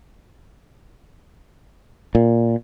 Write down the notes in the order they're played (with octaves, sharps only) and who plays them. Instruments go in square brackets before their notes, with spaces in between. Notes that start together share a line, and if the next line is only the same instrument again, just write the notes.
[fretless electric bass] A#2